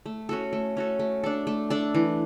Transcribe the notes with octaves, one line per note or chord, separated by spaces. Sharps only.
A3
C#4 F#4 A4
A3
C#4 F#4 A4
A3
D4 A4
A3
D4 A4
E3